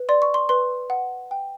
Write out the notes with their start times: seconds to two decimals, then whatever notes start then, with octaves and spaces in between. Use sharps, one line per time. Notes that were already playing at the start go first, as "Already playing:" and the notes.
Already playing: B4
0.09 D5 C6
0.22 C#6
0.34 C6
0.49 B4 C6
0.90 F#5
1.31 G5